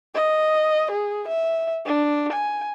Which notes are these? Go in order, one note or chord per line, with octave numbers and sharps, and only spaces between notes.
D#5
G#4
E5
D4
G#5